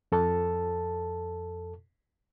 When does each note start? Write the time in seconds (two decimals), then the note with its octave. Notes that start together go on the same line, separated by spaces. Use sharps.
0.12 F2 A4 A5